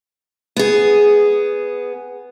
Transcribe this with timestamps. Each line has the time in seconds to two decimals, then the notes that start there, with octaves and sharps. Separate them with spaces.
0.56 B3 G#4